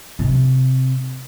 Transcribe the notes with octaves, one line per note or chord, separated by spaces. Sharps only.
C3